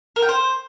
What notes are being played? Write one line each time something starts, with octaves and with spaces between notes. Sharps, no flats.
A#4
G5
C5